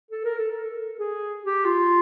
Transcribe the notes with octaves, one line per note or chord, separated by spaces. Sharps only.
A4
A#4
A4
A#4
A4
G#4
G4
F4